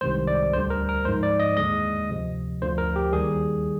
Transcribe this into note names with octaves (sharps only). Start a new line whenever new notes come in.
C2 C3 D#3 G#3 C5
D5
D2 D3 G3 C5
A#4
A#4
G#2 F3 G#3 C5
D5
D#5
D#2 D3 G#3 D#5
D2 C3 F3
D2 D3 F3 C5
A#4
G4
D#2 D#3 G3 G#4